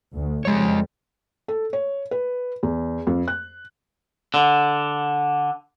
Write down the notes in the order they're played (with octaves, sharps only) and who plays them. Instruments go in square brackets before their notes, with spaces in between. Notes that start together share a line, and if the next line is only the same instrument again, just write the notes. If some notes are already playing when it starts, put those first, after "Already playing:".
[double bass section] D2
[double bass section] F2 G3 [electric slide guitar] G#3 C#5
[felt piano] A4
C#5
B4
E2
F2
F#6
[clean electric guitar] D3